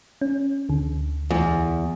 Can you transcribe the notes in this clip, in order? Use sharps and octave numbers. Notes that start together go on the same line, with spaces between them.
C#4
D2 D3
E2